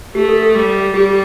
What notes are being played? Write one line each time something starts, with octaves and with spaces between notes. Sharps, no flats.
A3 G4
A4
A4
G3
G3 G4